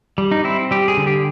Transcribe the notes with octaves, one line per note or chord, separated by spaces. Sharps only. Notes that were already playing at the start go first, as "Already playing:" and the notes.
G3
D#4
C4 E4
G3 G4
G#4
D3
G4